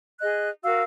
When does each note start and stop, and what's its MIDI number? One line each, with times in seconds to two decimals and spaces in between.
0.20 0.48 68
0.20 0.48 75
0.20 0.48 90
0.63 0.82 66
0.63 0.82 70
0.63 0.82 77
0.63 0.82 88